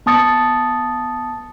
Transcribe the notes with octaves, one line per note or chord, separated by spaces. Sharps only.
B3 A5 D#6 A6 C#7